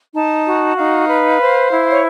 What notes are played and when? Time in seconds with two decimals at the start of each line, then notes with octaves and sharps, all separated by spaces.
0.15 D#4 A5
0.47 F#4
0.77 D#4 F5
1.08 B4
1.40 C5
1.71 E4
1.91 C#5